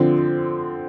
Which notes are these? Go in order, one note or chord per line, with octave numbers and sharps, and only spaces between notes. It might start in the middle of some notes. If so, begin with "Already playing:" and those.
Already playing: D3 F3 C4